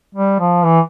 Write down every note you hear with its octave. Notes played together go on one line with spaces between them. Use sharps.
G3
F3
E3